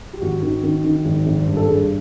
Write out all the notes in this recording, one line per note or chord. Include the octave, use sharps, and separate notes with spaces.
G4
G#1 F#4
D#3
D#3
D#3
G#1
G#1
G2
A4
G2 G#4